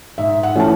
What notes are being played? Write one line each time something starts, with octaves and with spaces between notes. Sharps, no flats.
G#2 E5
F#5
E3 A3 C#4 A5